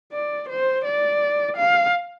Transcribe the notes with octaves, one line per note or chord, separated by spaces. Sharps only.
D5
C5
D5
F5